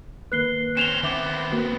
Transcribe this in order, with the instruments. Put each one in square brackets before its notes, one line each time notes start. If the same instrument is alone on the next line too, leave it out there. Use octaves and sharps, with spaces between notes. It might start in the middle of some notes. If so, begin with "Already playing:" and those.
[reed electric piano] D#3 A#3 B4 [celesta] F#6 C7 G7
[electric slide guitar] C4 C#4 [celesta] E7 F7 G7
[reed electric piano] D#3 E5 D6 [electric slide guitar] B3 C4
[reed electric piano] A#3 F#4